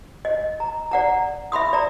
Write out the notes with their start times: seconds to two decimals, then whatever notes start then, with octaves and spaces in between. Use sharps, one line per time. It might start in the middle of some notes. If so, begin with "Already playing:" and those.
0.25 D#5
0.60 A#5
0.92 D5 F#5 A#5
1.52 E5 B5 C6 D#6
1.73 D5 A#5